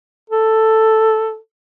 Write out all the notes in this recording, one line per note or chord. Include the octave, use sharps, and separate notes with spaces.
A4